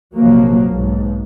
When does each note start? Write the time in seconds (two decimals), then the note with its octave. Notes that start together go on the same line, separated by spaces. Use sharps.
0.15 A#1 C3 F3 F#3 A#3
0.68 B1 G#2